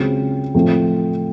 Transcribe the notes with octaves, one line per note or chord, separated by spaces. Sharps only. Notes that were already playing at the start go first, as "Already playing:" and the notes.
Already playing: C#2 C#3 F#3 C4
A2 F3 A3 C4